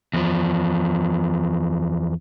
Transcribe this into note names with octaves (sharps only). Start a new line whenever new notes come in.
E2 F3